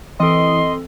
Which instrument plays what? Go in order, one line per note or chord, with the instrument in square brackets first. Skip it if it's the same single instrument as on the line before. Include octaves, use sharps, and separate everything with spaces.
[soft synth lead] E3 [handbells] C4 A4 [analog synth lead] D#5 [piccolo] C6